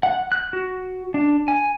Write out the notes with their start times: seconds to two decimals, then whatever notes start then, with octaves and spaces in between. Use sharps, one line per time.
0.03 F#5
0.32 F#6
0.53 F#4
1.14 D4
1.48 G#5